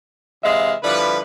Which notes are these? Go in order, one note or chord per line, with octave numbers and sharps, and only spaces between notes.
C3 E3 G#3 E5 F5
D3 F3 G3 E4 B4